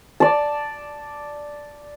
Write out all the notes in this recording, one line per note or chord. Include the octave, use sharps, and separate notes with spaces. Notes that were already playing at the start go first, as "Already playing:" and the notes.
D5 A5